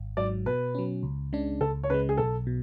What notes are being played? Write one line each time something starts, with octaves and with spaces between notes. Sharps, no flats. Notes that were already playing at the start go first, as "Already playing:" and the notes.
Already playing: G#1
G#2 F#3 D5
B2 B4
F#3 C#4
C#2
C#3 G#3 D4
C#2 A4
C#5
C#3 G#3 B4
G#4
B1 A4
B2